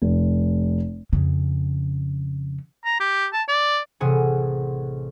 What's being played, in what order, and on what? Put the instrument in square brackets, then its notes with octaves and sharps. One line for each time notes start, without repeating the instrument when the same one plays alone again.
[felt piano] F1
[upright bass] F2 C#3
[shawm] A#5
G4
A5
D5
[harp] A1 C3 G#4 F#5 G#5